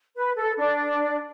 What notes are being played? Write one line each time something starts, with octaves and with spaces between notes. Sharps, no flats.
B4
A4
D4